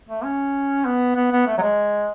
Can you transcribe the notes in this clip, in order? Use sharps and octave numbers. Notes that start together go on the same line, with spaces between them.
A3
C#4
B3
B3
B3
A3
F#3
G#3